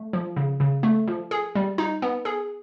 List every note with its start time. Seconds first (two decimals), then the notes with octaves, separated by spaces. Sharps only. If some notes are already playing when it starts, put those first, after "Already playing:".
Already playing: A3
0.13 F3
0.36 C#3
0.60 C#3
0.83 A3
1.08 F3
1.31 G#4
1.55 G3
1.78 D#4
2.02 B3
2.25 G#4